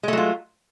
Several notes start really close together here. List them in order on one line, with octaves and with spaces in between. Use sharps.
G#3 A3 F#3 F4